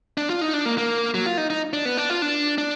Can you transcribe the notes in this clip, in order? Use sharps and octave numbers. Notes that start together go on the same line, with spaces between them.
D4
F4
D#4
D4
A#3
A#3
F#3
F4
D#4
D#4
D4
B3
D4
F4
D4
D4